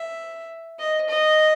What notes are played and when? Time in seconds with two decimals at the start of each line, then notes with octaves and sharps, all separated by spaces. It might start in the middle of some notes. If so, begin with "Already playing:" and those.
Already playing: E5
0.79 D#5
1.09 D#5